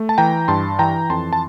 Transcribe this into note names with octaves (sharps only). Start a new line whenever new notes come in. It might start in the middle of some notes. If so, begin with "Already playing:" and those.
Already playing: A3
A5
E3 G5 A#5
G2 A5 C6
E3 G5 A#5
F2 A5 C6
A5